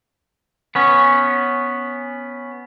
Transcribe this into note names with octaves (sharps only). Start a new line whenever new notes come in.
B3 C#4